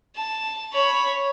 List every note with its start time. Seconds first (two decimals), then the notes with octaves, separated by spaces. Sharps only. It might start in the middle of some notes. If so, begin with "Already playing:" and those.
0.15 A5
0.73 C#5 B5